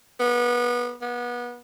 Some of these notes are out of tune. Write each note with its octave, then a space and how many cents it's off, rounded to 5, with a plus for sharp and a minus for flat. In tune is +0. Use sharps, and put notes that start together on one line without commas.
B3 -25
B3 -30